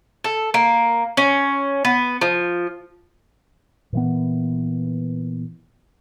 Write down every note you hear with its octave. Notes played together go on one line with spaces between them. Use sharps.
A4
A#3
C#4
B3
F3
A#2 E3 B3